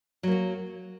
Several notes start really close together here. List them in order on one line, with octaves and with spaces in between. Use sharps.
F#3 A#3 F#4